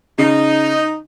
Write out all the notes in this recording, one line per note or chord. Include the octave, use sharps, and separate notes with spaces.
C#3 D#4